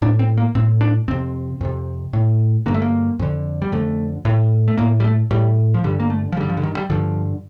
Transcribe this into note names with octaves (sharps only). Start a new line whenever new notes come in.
A2 D4
C4
A#3
A2 C4
D4
F2 C3 C4
F2 C3
A2
G2 D3 A#3
A3
A#3
F2 D3
G3
F2 D3 A3
A2
A3
A2 A#3
G3
A3
A2 G3
F3
G2 D3 G3
A#3
A3
F3
G2 D3 G3
F3
D3
D#3
G3
G2 D3 F3